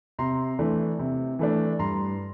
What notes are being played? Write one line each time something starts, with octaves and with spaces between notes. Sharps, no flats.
C3 A#5 C6
E3 A3 D4
C3
E3 A3 D4
G2 A#5 C6